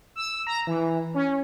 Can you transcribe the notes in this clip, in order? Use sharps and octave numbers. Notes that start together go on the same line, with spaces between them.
E6
A#5
E3
C#4